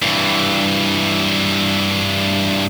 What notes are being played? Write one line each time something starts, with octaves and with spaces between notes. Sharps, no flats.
G2 E3